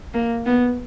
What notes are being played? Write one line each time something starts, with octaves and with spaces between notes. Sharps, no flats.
A#3
B3